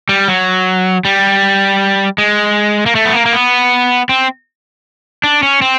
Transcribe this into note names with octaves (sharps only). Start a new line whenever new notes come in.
G3
F#3
G3
G#3
A#3
A3
B3
A#3
A#3
B3
C4
D4
C#4
C4